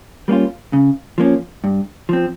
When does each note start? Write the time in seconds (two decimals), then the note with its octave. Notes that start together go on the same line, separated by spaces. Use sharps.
0.28 G3 A#3 C#4 F4
0.73 C#3
1.18 F3 A#3 C#4
1.64 G2
2.09 F3 C4